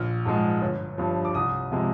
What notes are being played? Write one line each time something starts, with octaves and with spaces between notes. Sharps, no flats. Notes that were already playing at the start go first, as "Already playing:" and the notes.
Already playing: A#1 F6
G#2 F3 G#3
G1
G2 F3
D6
C2 D#6
C3 F3 G#3